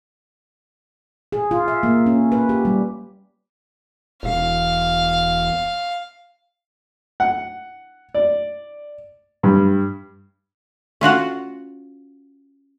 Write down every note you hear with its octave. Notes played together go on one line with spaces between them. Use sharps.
G#4
F4
E5
A#3
C#4
B4
G4
G3
E1 F5
F#5
D5
G2
C#4 F4 F#4 F#5